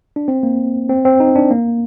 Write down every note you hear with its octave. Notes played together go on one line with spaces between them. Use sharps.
D4
C4
A#3
C4
C4
D#4
D4
A#3